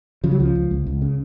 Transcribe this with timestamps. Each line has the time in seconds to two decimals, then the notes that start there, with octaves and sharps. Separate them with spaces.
0.24 C#3 F3
0.31 F#3
0.39 C#2 F3
0.55 C#2
0.71 C#2
0.87 C#2
1.02 C#3